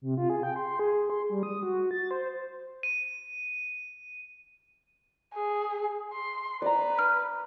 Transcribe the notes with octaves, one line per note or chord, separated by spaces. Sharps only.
C3
F4
G#4
G5
C6
G#4
C6
G3
D#6
F#4
A6
C5
D#7
G#4
C6
B4 D5 A#5
F6